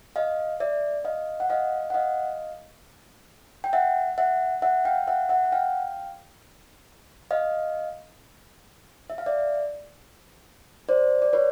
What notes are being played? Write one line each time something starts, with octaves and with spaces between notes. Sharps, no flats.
D#5 F5
D5 E5
D#5 F5
F#5
D#5 F5
F#5
D#5 F5
G5
E5 F#5
E5 F#5
E5 F#5
F5 G5
E5 F#5
E5 F#5
F#5
F5 G5
D#5 F5
E5
F5
D5 E5
C5 D5
D5
B4 C#5